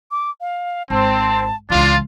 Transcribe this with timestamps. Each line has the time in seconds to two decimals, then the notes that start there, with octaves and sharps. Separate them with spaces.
0.11 D6
0.41 F5
0.90 G#1 C4 A5
1.70 C#2 E3 D4 F4 A6